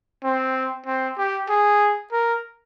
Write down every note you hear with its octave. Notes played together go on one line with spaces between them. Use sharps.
C4
C4
G4
G#4
A#4